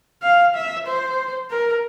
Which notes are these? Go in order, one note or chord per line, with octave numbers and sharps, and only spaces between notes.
F5
E5
C5
A#4